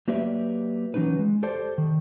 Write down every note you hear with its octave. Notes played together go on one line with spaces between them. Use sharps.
F#3 A#3 G4 B4 D5 E5
E3 F#3 C#4 D#4 B4
G#3
G4 A4 C5 D5 A5
D#3